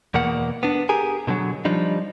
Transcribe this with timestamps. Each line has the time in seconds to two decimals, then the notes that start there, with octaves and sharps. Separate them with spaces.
0.14 E2 B2 A#3 F#5
0.63 B3 D4
0.89 G4 G#4 A#4 G#5
1.27 B2 D3 D#3 F#3
1.65 F3 G3 D4 D#4